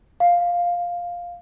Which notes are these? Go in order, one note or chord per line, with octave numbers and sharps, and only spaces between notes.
F5